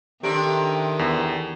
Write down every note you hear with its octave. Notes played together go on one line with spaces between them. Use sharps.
C3 D#3 A3 D4 G4 A#5 D7
E2